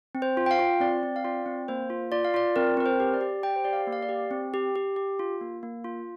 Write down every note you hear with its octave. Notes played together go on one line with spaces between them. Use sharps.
C4
C5
F4
G5
F5
F4
C4 D5
C4
F5
F4 D5
C4
A#3 C5
F4
F4 D5
F5
F4 D5
C4 A#4
C4 A#4
C5
G4
D5
G4
G4 G5
C5
G4 D5
F5
A#3
F5
D5
G4
C4
G4
G4
G4
F4
A#3
A#3
F4